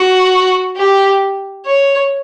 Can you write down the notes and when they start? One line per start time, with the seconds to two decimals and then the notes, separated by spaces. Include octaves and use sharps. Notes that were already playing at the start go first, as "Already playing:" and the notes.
Already playing: F#4
0.77 G4
1.65 C#5